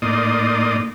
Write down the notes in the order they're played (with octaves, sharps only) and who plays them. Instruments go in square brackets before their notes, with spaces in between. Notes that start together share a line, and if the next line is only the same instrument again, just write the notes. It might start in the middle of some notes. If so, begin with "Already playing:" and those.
[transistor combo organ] A2 A#3 D#4 D5 C6 D#6